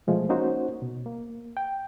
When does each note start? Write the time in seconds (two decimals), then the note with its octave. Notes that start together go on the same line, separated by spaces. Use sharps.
0.07 B2 F3 G#3 A3
0.29 A#3 C#4 D#4 F#4 C5
0.82 B2
1.06 A#3
1.57 G5